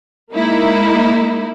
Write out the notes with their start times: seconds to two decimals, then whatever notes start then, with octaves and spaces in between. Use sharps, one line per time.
0.33 G#3 A#3 D#4 E4